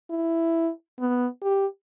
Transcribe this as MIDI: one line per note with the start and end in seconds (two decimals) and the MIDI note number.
0.10 0.70 64
1.00 1.27 59
1.43 1.66 67